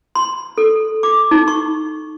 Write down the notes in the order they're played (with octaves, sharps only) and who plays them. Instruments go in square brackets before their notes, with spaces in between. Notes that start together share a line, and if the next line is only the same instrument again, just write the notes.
[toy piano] C6
A4
D6
D#4
C#6